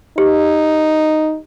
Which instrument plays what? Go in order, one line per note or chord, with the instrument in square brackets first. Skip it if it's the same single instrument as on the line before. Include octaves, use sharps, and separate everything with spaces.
[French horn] D#4 [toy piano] G4